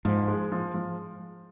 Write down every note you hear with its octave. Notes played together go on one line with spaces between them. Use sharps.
G#2 F3
G#3
F3
F3